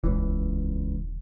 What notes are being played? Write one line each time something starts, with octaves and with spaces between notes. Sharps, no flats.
D#1 C#2 E3